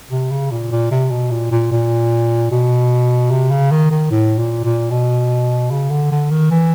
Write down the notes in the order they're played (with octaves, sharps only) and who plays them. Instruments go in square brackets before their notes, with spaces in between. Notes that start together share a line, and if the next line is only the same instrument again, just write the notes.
[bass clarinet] C3
C#3
A#2
A#2
C3
B2
A#2
A#2
A#2
B2
C3
C#3
D#3
D#3
A2
A#2
A#2
B2
C#3
D3
D3
D#3
E3